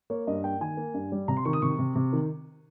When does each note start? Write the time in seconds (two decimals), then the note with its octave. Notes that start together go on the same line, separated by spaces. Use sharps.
0.10 A#3 C#5
0.27 G2 D#5
0.44 A#3 G5
0.60 D#3 G#5
0.77 A#3
0.94 G2
1.12 G3
1.28 C3 A#5
1.37 C6
1.45 D#3 C#6
1.53 D#6
1.62 C3 C#6
1.78 C3
1.95 C3
2.13 D#3